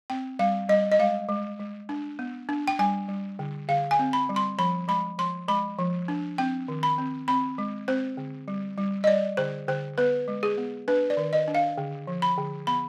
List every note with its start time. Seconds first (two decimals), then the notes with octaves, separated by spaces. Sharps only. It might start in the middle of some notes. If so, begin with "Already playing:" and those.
0.10 C4 G5
0.39 G3 F5
0.69 G3 D#5
0.92 D#5
0.99 G#3 F5
1.29 G#3
1.59 G#3
1.89 D4
2.19 B3
2.49 D4
2.68 G5
2.79 G3 G#5
3.09 G3
3.39 D3
3.69 D3 F5
3.91 G#5
3.99 C4
4.13 B5
4.29 G3
4.36 C6
4.58 F3 B5
4.88 G#3 B5
5.18 F3 C6
5.48 G#3 B5
5.79 F3
6.08 D4
6.38 C4 G5
6.68 D#3
6.83 B5
6.98 C4
7.28 C4 B5
7.58 G#3
7.88 C4 C5
8.17 D3
8.48 G3
8.78 G3
9.04 D#5
9.07 G3 D5
9.37 D3 C5
9.68 D3 C5
9.98 B3 B4
10.28 G#3
10.43 G#4
10.58 B3
10.88 D4 B4
11.10 D5
11.17 D#3
11.33 D#5
11.48 D4
11.55 F5
11.78 D3
12.07 F3
12.22 B5
12.38 D3
12.67 B3 B5